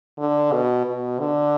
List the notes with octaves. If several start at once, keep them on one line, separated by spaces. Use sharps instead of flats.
D3
B2
B2
D3